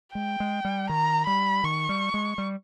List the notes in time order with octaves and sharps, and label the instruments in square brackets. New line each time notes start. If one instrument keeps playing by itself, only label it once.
[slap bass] G#3 [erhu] G5
[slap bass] G#3
G3
[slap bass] D#3 [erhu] A#5
[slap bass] G3 [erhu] B5
[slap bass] D#3 [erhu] C#6
[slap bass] G3
G#3
G3